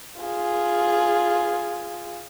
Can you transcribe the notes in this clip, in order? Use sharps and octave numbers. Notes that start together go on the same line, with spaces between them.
F4 G#4